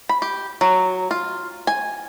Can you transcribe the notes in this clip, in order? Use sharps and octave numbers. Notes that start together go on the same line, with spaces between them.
B5
G4
F#3
F4
G#5